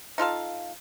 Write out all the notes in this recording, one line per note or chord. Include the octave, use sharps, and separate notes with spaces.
D#4 F4 A4 F5